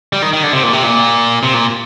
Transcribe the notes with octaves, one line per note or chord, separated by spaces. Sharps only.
G3
D#3
D#3
D3
C3
A#2
C3
A#2
C3
A#2